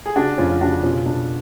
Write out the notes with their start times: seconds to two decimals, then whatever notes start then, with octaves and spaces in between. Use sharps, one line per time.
0.06 G#4
0.16 C#3 D4 F#4
0.38 F2 C#4 F4
0.61 C#3 D4 F#4
0.83 B2 C#4 F4
1.06 B2 D4